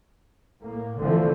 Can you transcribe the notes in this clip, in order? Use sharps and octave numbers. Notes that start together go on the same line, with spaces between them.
A2 A#3
D3 E3 F3 A3 C4